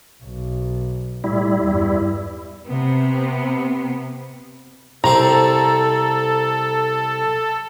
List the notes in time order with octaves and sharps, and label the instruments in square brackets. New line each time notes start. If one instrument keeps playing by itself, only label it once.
[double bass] B1
[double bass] A2 [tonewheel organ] G3 E4
[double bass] E2 G2
[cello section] C3 B3
[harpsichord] C2 C4 C5 [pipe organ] A4 [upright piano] A#5